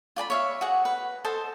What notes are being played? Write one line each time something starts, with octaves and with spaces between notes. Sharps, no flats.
F4 D5 A5 B5
C#5 E5 F5
F#4 G#4 F#5
B4
A4 C5 D#5 A5